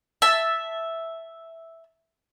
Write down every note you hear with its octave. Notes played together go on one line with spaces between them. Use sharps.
E5 A5